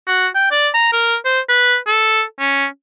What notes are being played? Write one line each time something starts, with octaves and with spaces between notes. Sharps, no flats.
F#4
G5
D5
A#5
A#4
C5
B4
A4
C#4